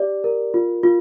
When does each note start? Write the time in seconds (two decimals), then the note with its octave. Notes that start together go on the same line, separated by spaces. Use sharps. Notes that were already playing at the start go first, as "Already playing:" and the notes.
Already playing: G4 D5
0.24 A#4
0.54 F4
0.83 F4